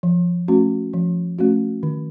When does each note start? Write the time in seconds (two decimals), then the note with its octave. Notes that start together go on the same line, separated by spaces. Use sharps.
0.03 F3
0.48 A3 C#4 F#4
0.93 F3
1.39 A3 C#4 F#4
1.83 D#3